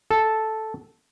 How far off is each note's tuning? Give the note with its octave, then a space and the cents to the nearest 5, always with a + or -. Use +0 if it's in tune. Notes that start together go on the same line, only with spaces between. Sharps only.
A4 -5